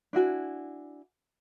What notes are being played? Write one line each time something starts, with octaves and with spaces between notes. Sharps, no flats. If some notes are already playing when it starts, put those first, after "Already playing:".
D4 E4 F#4 G#5